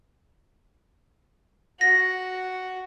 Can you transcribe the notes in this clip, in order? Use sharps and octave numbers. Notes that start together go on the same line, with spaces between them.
F#4 A#6